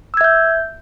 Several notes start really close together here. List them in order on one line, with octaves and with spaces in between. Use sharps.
E6 G#6 E5 G6